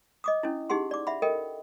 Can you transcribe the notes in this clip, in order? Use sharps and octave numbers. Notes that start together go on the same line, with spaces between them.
D#5 D6 D#6
C#4 D4 E4
D#4 G4 G#4 F#5 C6
D5 D6
E5 F#5 B5
A4 A#4 D#5 G5